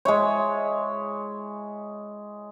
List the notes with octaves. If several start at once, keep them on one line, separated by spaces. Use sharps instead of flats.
G#3 E4 C#5